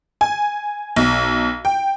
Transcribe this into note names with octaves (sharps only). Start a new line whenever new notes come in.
G#5
B1
G5